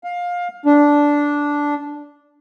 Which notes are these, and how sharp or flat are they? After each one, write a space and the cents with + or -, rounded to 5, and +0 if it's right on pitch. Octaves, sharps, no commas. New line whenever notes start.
F5 +20
D4 -10